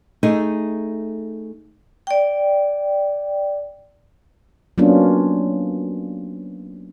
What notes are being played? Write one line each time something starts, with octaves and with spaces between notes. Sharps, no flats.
A3 D#4 G#4
D5 G5
F#3 A#3 B3 C#4 D4 F4